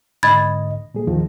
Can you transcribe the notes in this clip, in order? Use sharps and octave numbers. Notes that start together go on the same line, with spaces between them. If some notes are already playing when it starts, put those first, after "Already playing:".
G#2 D3 D#5 B5 G#6 A6
A#2 G3 G#4
D#2 D#3 F3